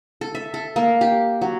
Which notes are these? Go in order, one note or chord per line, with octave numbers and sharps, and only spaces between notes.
A4
E5
A4
A#3
G4
F#3